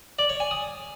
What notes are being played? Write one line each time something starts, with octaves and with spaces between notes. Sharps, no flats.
D5
C#5
G#5
D#6